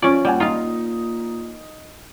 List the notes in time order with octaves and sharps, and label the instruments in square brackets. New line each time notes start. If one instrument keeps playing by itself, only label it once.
[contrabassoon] F3 [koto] C#4 D5 [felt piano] F4
[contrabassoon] A#2 [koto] G3 [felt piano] D5 F#5 G#5
[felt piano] D#4 [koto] F4 F5